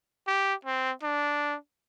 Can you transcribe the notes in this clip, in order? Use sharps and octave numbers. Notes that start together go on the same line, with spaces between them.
G4
C4
D4